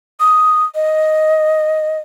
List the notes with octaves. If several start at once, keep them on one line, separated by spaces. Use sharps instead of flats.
D#6
D#5